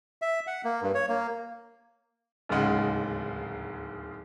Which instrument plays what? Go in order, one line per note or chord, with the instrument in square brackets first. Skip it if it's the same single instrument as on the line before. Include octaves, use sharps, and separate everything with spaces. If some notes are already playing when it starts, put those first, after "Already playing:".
[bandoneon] E5
F#5
A#3
G2
C#5
A#3
[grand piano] D1 D#2 G#2 C#3 G#3 F#5